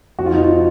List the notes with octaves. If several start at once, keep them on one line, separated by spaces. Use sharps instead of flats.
F2 F3 F#4
F4
D#4
F4
F3